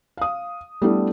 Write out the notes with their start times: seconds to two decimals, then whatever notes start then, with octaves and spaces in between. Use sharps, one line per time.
0.17 F5 D#6
0.82 G3 A3 B3 D4 E4